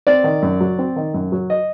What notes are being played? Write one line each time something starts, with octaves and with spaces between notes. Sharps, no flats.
C4 D5
D#3
F#2
F#3
C4
D#3
F#2
F#3
D#5